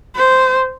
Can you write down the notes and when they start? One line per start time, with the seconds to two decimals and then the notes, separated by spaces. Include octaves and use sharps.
0.16 C5